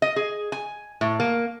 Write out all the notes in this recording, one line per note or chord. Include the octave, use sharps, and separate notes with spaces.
D#5
G#4
G#5
A2
A#3